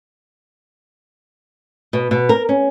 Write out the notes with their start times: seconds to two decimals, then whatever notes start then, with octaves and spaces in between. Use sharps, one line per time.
1.93 B2
2.11 B2
2.29 A#4
2.49 C#4